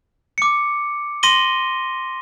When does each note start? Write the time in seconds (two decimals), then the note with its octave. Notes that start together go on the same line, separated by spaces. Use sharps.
0.38 D6 C#7
1.23 C6 A#6 D#7 G7